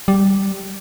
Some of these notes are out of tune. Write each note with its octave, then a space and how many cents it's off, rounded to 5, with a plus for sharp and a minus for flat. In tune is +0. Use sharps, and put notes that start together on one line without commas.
G3 -5